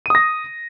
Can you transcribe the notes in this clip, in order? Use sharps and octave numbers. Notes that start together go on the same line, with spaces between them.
D#6 A#6 D#7